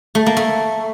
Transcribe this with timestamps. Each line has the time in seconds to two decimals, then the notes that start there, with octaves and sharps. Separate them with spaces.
0.15 A3
0.26 A#3
0.37 A3